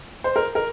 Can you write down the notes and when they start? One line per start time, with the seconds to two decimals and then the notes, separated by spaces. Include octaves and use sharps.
0.24 C5
0.36 A#4
0.55 A#4